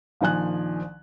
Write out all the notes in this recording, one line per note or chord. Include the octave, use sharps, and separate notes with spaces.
A#1 D#3 F3 G#5 F#6